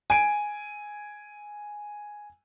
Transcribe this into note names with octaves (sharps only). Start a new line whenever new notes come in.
G#5 D7